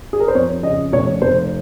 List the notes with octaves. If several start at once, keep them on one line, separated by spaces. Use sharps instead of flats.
G#4
A#4
C5
F2 C#5
C#3 D#5
F1 C#5
F1 C5